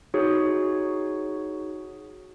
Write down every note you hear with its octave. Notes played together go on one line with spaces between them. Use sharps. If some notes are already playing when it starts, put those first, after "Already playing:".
D#4 F#4 G#4 C#5